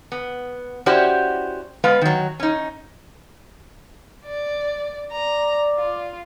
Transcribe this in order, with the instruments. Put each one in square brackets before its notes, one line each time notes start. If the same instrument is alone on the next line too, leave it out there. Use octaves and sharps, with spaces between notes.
[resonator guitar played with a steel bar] B3
C#4 E4 F#4 G4 C5 D5
G#3 B3 B4 F5
D#3 F#3
C#4 D#4
[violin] D5
[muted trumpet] D5 [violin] A#5
[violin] F4